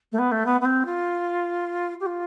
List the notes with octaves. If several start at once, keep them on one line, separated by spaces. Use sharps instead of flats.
A3
B3
A3
B3
B3
C4
F4
G4
F4